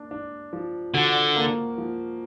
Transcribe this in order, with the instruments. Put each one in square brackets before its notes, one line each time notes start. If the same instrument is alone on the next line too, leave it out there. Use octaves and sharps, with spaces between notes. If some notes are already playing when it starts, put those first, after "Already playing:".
Already playing: [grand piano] A#3 D4
D4
F3
[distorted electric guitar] D3 [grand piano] F#4
[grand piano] A#3
F3